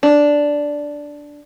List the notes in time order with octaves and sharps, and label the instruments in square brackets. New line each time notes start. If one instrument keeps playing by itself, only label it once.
[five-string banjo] D4